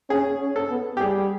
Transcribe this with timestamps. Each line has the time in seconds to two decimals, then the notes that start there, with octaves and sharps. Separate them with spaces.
0.10 C#4 G#4
0.40 C#4
0.56 A4
0.70 B3
0.97 G4
1.01 G3 G#4